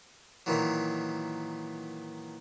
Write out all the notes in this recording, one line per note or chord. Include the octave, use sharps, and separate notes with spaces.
A#2 D#3 E3 F#3